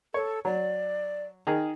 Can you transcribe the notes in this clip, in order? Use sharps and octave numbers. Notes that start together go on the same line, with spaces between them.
A4 C#5
F#3 D5
D#3 G#4 A#5